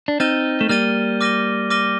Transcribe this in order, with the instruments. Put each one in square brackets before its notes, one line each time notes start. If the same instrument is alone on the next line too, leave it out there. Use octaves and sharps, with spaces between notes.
[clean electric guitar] D4
[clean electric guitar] C4 D#4 [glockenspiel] F6 A6 D#7 G7
[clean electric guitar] A3
[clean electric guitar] G3 A#3 [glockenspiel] F6 A6 D#7 G7
[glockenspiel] D6 F6 A#6 D#7 G7
D6 F6 A#6 D#7 G7